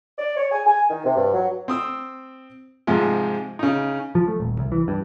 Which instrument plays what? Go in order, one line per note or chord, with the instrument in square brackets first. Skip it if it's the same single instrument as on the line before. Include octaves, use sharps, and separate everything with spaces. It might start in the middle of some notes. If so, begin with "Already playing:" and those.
[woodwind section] D5
C#5
G#5
G#5
D#3
C3
G2
F#3
[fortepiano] C4 D#6 E6
G#2 C3 F3 G#3
C#3 D#4
[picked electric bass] F3
A3
D#1
C2
E3
G2